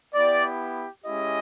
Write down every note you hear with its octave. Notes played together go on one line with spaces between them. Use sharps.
B3 E4 G4 D5
G#3 C#4 E4 G4 D#5